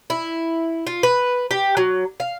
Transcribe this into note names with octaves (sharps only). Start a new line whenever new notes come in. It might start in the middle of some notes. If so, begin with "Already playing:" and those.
E4
F4
B4
G4
F#3
F5